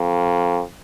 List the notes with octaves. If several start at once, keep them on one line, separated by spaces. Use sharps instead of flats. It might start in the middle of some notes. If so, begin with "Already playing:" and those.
Already playing: F2